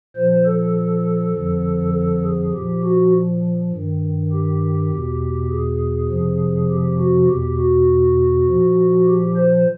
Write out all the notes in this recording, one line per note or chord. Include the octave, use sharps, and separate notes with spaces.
A#2 F3 C5
A4
F2 D3 F3
A4
G#4
A#2 F3 G4
F#4
G2 D#3
G4
E2 B2
G#4
F2 C3 F3
G4
F#4
E2 B2 G4
F#4
A#2 F3
G4
C5